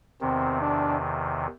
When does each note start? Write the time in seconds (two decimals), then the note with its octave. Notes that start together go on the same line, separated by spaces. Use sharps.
0.21 E2 C3 D#3 C4
0.61 D4